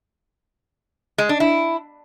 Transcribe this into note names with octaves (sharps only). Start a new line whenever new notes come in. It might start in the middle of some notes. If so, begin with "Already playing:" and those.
G#3
D4
E4